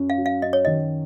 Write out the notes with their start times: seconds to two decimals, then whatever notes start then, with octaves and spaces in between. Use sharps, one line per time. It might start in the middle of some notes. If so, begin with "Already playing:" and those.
Already playing: F#2
0.10 F5
0.18 F#3
0.26 F5
0.42 F#2 D#5
0.53 C#5
0.65 D#3 D#5